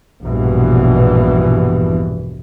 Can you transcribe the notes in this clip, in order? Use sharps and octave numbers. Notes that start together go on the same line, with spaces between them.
A#1 E2 G2 B2 E3